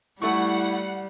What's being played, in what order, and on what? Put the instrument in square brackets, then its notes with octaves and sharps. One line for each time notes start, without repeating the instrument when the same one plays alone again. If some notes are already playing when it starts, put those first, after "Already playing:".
[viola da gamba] G3 [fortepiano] A3 C#6 [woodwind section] E4 [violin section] F#5